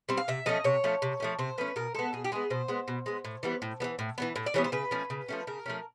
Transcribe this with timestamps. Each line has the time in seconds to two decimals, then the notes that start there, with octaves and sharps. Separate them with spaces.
0.09 G3 C4
0.17 F5
0.28 C3 E5
0.46 F3 A3 C#4 D#5
0.64 C3 C#5
0.84 F3 A3 C#4
1.02 C3
1.20 F3 A3 C#4
1.39 C3 C5
1.58 F3 A3 C#4 B4
1.76 B2 A#4
1.95 G#3 B3 A4
2.13 B2 G#4
2.25 G4
2.32 G#3 B3 G#4
2.50 B2 C5
2.68 G#3 B3
2.88 B2
3.06 G#3 B3
3.25 A2
3.43 E3 G3 B3
3.62 A2
3.80 E3 G3 B3
3.99 A2
4.18 E3 G3 B3
4.36 A2
4.46 D5
4.54 E3 G3 B3 C#5
4.64 C5
4.72 C#3 B4
4.91 F3 A3 C#4
5.10 C#3
5.29 F3 A3 C#4
5.47 C#3 A#4
5.66 F3 A3 C#4